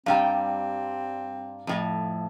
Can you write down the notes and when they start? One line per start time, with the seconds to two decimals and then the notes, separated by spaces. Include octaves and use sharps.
0.06 G2 G3 C4 F5 G5 A#5
1.67 F2 A2